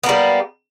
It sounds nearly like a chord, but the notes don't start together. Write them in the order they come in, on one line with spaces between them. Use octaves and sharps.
B3 A#3 G3